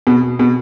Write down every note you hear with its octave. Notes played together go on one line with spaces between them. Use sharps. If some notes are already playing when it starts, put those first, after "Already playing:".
B2
B2